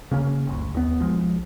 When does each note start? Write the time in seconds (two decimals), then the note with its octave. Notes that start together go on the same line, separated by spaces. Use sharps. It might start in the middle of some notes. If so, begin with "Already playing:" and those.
0.11 C#3 A#3 C#4
0.47 G1 D2
0.74 D#2 B3
0.99 B1 F3 G#3